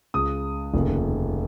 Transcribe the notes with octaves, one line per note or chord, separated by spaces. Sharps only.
C#2 C#3 D#6
F1 D#2 C#3